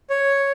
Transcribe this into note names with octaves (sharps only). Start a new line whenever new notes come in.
C#5